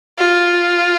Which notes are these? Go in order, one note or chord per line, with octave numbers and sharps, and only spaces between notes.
F4